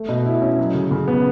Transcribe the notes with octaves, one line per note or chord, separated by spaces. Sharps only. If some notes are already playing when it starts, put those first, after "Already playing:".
Already playing: A3
B2
E4
C#4
F#3
C#3
C#3
B3